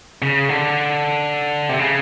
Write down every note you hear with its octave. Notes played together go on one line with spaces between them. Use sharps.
C#3
D3
C3
C#3